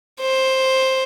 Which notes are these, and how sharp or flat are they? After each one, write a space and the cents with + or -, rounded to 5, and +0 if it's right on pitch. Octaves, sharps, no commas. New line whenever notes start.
C5 +10